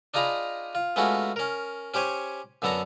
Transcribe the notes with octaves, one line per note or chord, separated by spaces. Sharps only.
D4 D#4 F4 G#4 A#5 B5
F4
G#3 A3 B3 C#4 F4 F#4
C#4 A#4
C#4 G4 C5 C#5 G#5
F#2 D3 B3 A4 F#5 A#5